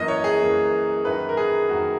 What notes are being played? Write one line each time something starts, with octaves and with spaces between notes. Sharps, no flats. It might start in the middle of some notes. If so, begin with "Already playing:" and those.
Already playing: F#2 E3 A#3 D#5
C#5
G#4
F#2 E3 A#3
F#2 D#3 A#3 B4
A#4
G#4
F#2 D#3 A#3 F#4